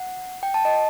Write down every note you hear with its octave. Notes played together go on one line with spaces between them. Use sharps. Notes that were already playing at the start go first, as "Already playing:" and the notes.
Already playing: F#5
G5
A5
D#5